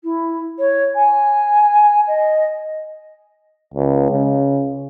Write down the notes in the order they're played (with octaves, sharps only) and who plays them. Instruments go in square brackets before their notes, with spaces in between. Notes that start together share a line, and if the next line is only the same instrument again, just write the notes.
[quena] E4
C#5
G#5
D#5
[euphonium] C#2
C#3